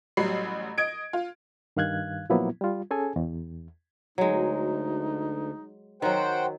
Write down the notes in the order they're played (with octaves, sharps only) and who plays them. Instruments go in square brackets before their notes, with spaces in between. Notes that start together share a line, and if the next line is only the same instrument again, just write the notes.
[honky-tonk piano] A1 F#3 G3 B5 C7
D#5 G#6 D7
F4
[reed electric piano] G2 D#3 F5 F#6 G#6
A#2 F3 F#3 A#3 B3 E4
G3 F4
C#4 G#4 A4 G#5
E2
[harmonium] D2 [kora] F#3 G#3 [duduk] D#4
[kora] D#3 F#3 [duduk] F#4 [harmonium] C5 F#5 G5